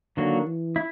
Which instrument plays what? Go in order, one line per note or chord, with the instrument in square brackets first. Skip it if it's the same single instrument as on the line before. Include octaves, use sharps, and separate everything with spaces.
[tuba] D3 [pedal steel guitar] D#3 F#3 A#3 D4 F#4
[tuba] E3
[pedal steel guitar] E4